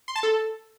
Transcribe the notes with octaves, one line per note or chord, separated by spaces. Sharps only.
C6
A5
A4